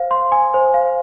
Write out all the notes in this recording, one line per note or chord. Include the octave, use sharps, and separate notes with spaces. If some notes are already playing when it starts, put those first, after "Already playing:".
Already playing: C5 F5
C6
G#5
C5
F5